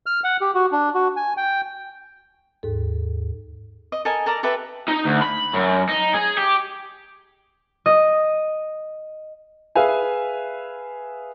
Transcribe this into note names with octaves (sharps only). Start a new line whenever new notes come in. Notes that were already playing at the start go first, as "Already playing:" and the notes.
F6
F#5
G4
F#4
D4
F#4
G#5
G5
D#2 G#2 A4
D#5
A4 A#4 D#5 G#5
A4 A#4 D5 A#5
G4 A4 B4 E5
D#4
D2
B5
F#2
D#4
G#4
G4
D#5
G#4 B4 E5 F5 G#5